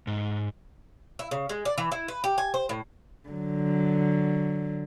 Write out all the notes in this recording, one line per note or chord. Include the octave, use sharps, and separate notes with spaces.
G#2
E4
C#3
G#3
D5
E3
E4
B4
G4
G#5
C5
A2
D3 F#3